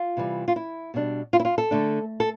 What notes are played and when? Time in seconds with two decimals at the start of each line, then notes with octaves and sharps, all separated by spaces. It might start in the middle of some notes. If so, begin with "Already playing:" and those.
Already playing: F4
0.17 C3 E3 G3
0.48 F4
0.56 E4
0.94 B2 G3 D4
1.33 F4
1.40 E4
1.45 F4
1.58 A4
1.71 D3 A3 D4
2.20 A4